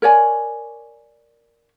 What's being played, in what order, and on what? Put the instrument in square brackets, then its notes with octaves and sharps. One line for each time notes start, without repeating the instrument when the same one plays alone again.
[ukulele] A#4 C#5 D5 G#5